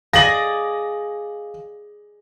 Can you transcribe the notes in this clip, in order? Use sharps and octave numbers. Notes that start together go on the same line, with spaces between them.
G#4 D5 D#5 F5 A#6 F#7